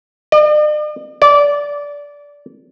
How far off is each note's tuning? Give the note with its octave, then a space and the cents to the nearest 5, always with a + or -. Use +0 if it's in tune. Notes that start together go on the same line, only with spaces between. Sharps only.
D5 +45
D5 -20